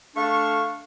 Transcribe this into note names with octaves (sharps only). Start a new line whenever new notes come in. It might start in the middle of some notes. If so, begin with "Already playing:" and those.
A3 D4 F5 C#6